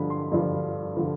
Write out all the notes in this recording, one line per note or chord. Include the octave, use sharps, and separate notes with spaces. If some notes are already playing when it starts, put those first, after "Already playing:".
Already playing: G2 D3 F3 B5
C6
G2 D3 F3
D3 F3